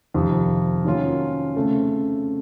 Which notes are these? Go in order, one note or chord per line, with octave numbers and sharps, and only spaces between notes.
F2 C3 D#3
D#3 F#3 A#3 C#4 F4
C#3 A3 C4